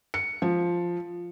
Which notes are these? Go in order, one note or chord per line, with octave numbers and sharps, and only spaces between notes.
C#7
F3